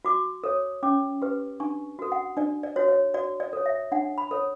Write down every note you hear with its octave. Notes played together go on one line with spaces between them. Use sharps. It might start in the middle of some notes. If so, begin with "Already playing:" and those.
F#4 D6
A4 C#5
C#4 D6
G4 B4
D4 C#6
F#4 A4
F#5
D4 D5
D5
F#4 C#5
C#5
F#4 D5
D5
A4 C#5
E5
D4 F#5
B5
A4 C#5